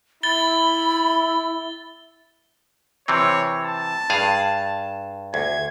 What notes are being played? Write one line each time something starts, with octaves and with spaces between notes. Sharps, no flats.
E4 B5 A6 G7
C3 E3 C4 C#5
A5
G2 G#4 F5
D2 G#6